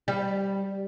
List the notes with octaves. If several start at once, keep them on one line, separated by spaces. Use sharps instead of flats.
G3